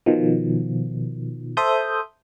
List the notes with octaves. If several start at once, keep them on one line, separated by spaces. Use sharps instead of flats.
B2 D#3 F3
A4 C5 E5 D#6 G6